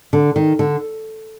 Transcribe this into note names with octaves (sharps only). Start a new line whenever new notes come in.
D3
D#3
D3